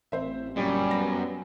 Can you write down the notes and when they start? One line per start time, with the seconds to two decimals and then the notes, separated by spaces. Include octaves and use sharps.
0.12 A1 C4 C5 E5
0.56 G1 F#2 A#2 G3 C#4
0.91 B3 A#6